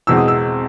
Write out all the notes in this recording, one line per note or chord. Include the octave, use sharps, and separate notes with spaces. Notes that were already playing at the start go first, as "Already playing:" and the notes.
E2 B2 G#3 C4 E6
D#6
E6